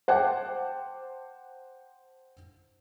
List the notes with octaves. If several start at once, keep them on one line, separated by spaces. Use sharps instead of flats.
C5 F#5 G5 A5 D6